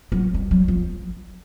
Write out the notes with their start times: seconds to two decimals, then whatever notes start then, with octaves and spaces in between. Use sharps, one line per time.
0.12 F#3
0.34 G3
0.51 F#3
0.68 F3